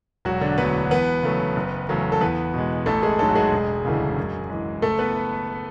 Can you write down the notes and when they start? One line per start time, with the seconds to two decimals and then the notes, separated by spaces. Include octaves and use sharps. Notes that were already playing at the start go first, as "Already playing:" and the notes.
0.25 E1 F#3 F#4
0.41 D3 D4
0.58 D2 D3 F#3 B3 B4
0.91 E2 B3 B4
1.23 C#3 F#3 A3
1.56 F#1
1.89 E2 C#3 F#3 A3
2.12 A4
2.21 E2 B3 B4
2.54 B2 G#3
2.86 A1 A3 A4
3.02 G#3 G#4
3.19 G#2 F#3 A3 A4
3.29 F#4
3.35 G#3 G#4
3.52 E1
3.85 D2 C#3 E3 A3
4.17 F#2
4.50 E3 G#3
4.82 F#1 A3 A4
4.99 B3 B4